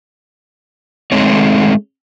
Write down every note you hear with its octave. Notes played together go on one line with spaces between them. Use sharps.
G#3 A3 C4 D#4 C#5